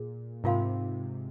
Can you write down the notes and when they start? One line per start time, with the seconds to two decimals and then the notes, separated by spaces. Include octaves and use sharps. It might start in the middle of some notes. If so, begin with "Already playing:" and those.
Already playing: A#2 G#4
0.44 G#2 C3 F4 A#4 F5 C6